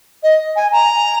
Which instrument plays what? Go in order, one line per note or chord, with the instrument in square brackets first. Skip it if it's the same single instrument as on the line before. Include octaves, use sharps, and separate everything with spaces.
[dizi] D#5
G#5
A#5